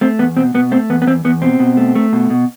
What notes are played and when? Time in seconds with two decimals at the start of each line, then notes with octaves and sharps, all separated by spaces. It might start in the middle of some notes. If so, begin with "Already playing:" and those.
0.01 A3 C4
0.19 E2 B3
0.37 B2 C4
0.54 B2 B3
0.72 A3 C4
0.90 E2 B3
1.02 B3
1.07 E2 C4
1.25 E2 B3
1.42 B2 C4
1.60 B2
1.77 A3
1.95 A3
2.13 B2
2.30 B2